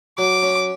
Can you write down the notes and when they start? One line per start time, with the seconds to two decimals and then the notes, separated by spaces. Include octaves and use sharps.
0.18 F#3 D6
0.43 C#4